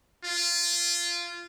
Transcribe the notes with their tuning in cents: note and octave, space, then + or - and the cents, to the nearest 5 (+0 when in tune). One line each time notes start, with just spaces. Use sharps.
F4 -15